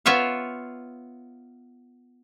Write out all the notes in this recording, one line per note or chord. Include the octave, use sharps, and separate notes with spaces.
B3 F4 C#5 E5 F5